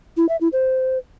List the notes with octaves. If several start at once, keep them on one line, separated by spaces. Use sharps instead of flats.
E4
E5
E4
C5